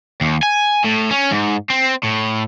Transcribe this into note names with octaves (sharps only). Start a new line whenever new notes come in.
D#2
G#5
A2
C#4
G#2
C4
A2